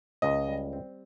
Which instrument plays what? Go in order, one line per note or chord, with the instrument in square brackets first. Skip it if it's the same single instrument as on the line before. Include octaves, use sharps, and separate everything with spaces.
[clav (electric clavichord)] C#2 [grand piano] D#5
[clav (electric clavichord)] G3
C4